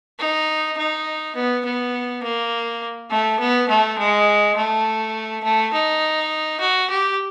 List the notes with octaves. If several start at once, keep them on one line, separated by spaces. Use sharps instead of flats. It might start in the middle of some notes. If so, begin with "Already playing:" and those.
D#4
D#4
B3
B3
A#3
A3
B3
A3
G#3
A3
A3
D#4
F#4
G4